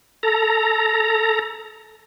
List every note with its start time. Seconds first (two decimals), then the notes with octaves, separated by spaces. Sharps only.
0.23 A4 A#5